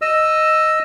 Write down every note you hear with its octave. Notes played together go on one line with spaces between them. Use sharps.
D#5 E6